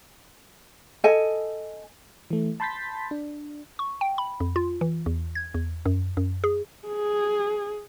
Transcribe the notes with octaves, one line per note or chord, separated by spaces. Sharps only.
A4 D#5 G#5
E3 A3
A5 B5 C6 G6 A6 B6
D4
C#6
G5
B5
F2
F4
E3
E2
G#6
E2
F#2
F#2
G#4
G#4